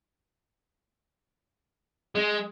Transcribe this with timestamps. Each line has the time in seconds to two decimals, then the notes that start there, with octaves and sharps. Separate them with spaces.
2.15 G#3